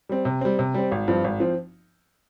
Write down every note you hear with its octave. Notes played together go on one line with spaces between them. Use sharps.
G3 C4
C3
G3 C4
C3
G3 C4
G#1
G2 F3 C4
G#1
F3 C4